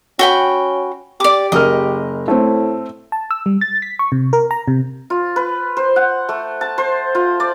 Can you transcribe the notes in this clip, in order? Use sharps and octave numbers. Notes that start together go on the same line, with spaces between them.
C#4 F#4 G5 B5
G4 D5 D6
F#1 A#4 D#5 F6
A2 A3 C4
A5
E6
G3
A6
B6
C#6
C3
A#4
A#5
C3
F4
B4
C5
F#5
A3
A5
C5
F4
D5